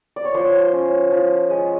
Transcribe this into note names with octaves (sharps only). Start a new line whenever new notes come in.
D5
C#5
F3 C5
C#4
F3
G#3